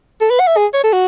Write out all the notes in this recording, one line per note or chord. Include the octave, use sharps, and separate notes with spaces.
A4
B4
F#5
E5
G#4
C#5
A4
F#4